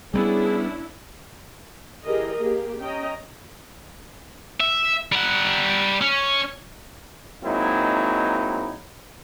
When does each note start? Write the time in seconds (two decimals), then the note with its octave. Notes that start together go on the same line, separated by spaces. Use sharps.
0.14 G3 A3 B3 C#4 D4 E4 G#4
2.04 E3 G4 G#4 A#4 D#5
2.38 A#3 G4 G#4
2.80 C#4 D#5 G5 A#5
4.60 E5
5.12 G3 F#5
6.01 C#4
7.43 F#3 G#3 A#3 C4 D#4 E4